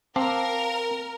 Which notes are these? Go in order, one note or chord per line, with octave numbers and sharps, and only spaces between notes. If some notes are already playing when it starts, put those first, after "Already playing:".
C4 A#4 F5 A5 D6